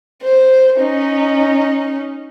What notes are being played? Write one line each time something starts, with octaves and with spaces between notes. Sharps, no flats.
C5
C#4 D#4